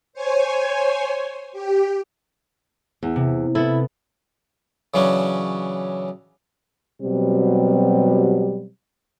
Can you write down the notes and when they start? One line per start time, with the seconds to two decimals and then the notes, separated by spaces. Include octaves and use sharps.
0.13 C5 C#5 G#5
1.52 G4
3.03 E2
3.16 C3
3.55 B3 E4 A4
4.94 C#3 E3 F#3 C#4 D4
7.02 B2 F#3 G3 C4 G4